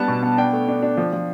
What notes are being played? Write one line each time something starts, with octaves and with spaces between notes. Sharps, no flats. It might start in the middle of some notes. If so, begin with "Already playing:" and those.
Already playing: G3 B3 D4 A5
B2
B3
D4 G5
A3
D4
D4
F3
F3